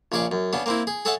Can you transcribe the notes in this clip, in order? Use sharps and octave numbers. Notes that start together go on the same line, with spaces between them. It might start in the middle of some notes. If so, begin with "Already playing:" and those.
A#1 C#3 G#4 D5 C#6
F#2
C#3 B3 D4
A#3 C4 E4
G#4
G#4 A4 C#5 E5 F#5 A5